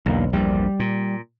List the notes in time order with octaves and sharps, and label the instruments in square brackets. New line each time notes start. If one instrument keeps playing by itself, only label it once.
[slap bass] B1 [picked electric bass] E2 D3 A#3
[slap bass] A#1 E2 G2 [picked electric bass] G3
[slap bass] A#2